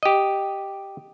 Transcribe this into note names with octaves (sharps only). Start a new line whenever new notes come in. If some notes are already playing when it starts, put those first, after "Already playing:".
G4 D#5